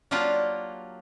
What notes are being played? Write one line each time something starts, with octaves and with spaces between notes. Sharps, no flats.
F#3 A#3 D4 F4 G4